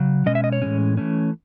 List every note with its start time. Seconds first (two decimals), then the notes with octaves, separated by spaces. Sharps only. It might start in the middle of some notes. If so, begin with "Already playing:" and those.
Already playing: C#3 F#3
0.26 B2 G#3 C#4 D#5
0.35 E5
0.44 D#5
0.52 C#5
0.62 A2 E3 G#3 C#4
0.97 E3 A3 C#4